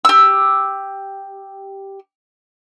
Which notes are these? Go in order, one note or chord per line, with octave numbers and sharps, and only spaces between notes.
G4 E6